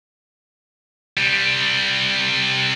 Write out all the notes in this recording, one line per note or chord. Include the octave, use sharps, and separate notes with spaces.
C3 G3